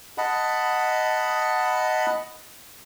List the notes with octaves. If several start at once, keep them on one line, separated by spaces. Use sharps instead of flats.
D#5 F#5 A5 B5